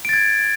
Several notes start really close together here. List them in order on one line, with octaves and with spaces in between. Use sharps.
D7 A6 G#6